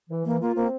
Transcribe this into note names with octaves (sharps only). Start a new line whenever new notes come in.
E3
E3 A#3
A#3 F4
A#3 C4